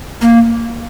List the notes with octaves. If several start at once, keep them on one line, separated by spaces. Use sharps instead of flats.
A#3